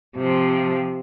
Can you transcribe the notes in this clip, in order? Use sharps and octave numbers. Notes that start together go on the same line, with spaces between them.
C3 F3